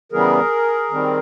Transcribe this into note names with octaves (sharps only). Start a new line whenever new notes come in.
C#3 E3 G3 B3 G#4 A#4
D#3 G3 C4